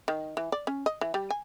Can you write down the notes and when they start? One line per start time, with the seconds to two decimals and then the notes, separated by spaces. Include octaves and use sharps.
0.08 D#3
0.37 E3
0.52 D5
0.67 C#4
0.86 D#5
1.01 E3
1.14 G3
1.30 G#5